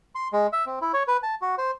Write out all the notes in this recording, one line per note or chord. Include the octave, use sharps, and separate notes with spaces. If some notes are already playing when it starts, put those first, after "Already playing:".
C6
G#3
E5
C4
E4
C#5
B4
A5
F#4
C5